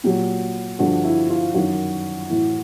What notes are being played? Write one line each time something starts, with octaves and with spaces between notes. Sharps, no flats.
A#2 F#3 G4
G2 D3 F3 F#4
E4
F4
F#2 D#3 F#3 F#4
A2 E3